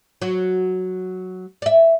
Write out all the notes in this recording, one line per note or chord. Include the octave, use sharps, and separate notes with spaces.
F#3 F#4
D5 E5